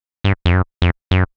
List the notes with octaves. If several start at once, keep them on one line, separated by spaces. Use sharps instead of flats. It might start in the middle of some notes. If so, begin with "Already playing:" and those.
G2
F2
F#2
F2
F#2